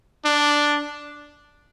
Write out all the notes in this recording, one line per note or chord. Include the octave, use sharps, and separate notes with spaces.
D4